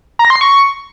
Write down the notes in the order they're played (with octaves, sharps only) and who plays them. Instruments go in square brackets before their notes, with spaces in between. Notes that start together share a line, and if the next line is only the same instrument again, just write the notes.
[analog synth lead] A#5
A#6
C6
C7
C#6